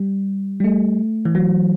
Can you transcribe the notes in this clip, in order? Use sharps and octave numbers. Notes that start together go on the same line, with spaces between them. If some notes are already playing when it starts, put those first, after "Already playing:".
Already playing: G3
G3
A3
E3
F#3